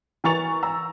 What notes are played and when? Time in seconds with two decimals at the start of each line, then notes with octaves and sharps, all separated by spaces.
0.24 E3 A#4 C#6 A6 F7
0.63 A#5 E6